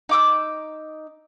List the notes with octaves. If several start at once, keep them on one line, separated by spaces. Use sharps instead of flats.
D#4 D6 E6